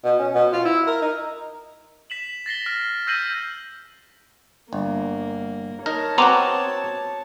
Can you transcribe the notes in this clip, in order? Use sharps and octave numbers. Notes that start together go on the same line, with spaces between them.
B2
C#4
B2
F4
E4
A#4
D#4
B6 E7 F#7
A6 A#6 C7 G7
F6
E6 G6 A#6 C7 D#7 F#7
G1 A#3
D#4 A#4 C#5 A5
B3 C4 F#4 A#5 C6 D6